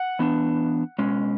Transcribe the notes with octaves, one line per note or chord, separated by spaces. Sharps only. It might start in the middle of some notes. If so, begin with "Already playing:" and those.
Already playing: F#5
E3 B3 D4
B2 G#3 C#4